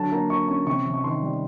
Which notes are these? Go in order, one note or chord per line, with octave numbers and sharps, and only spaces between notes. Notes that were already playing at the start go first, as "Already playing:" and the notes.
Already playing: D3 F#3 A5
A#3 A#5
A#3 C#6
C#4 C#6
C3 C#6
C3
C#6
D#3 C6
G3